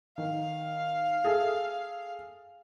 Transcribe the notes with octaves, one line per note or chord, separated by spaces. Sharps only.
D#3 F5
G#4 A4 E5